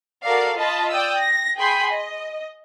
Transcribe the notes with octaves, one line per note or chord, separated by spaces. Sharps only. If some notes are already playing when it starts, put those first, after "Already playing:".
F#4 A4 A#4 D5 F5
F4 D#5 A5 B5
D5 G5 D#6 E6
A#6
G#4 G5 G#5 B5 C6
D#5